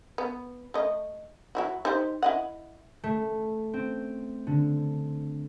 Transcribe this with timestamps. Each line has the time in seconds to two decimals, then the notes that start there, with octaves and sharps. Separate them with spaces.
0.18 B3
0.74 A3 D#5
1.55 F#3 E4 F#4
1.85 D#4 G4 C5
2.23 E4 D#5 F#5
3.04 A3
3.73 C4
4.47 D3